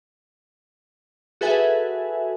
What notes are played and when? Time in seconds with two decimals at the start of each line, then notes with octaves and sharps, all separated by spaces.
1.41 F#4 G#4 A4 B4 E5 G#5